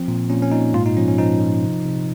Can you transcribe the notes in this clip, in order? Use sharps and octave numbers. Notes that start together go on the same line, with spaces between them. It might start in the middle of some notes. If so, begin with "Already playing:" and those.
Already playing: F3 C4
A#2
A#2 C#4
C#4
A#2 D#4
G#2 F4
D#4
F3 C#4
C#4
F3 D#4
F3
C3
C3